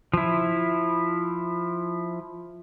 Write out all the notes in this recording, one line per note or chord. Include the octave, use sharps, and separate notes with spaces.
F3 E4